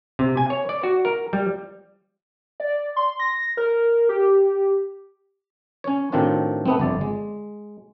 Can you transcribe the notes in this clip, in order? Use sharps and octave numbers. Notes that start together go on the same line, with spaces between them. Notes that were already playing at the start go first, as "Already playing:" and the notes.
C3
G#5
C#5
D5
F#4
A#4
G3
D5
C6
A#6
A#4
G4
C#4 C#5
A2 D#3 C4 D4 F4 F#4
A3 B3 C4
G1 F2 D5
G#3